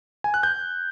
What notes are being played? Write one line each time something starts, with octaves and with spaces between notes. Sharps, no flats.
G#5
F#6
G6